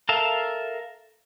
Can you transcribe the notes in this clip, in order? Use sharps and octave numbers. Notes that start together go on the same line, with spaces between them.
A4 A#4 E5 F5 A5